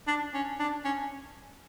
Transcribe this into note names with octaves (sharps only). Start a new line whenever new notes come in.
D4
C#4
D4
C#4